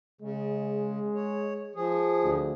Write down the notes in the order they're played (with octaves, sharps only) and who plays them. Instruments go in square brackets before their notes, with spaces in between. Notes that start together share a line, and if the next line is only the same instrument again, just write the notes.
[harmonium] C#3 [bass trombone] G#3
[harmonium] C#5
F3 G#4
[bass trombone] D2